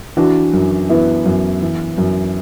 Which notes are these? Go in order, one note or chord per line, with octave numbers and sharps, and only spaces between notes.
E3 D4 F#4
F#2
E3 B3 E4
F#2
E3
F#2